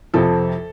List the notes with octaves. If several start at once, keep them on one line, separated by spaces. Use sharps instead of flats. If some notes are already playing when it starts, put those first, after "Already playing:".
F2 C3 F3 A4